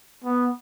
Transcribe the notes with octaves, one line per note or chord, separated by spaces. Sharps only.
B3